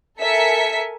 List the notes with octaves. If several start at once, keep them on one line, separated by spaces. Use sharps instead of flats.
A4 A#4 E5 G#5 B6 C#7